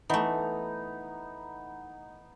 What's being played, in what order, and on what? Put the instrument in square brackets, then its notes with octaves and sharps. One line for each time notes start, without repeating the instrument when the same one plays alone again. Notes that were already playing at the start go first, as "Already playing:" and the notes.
[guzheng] E3 A3 [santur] B3 D#4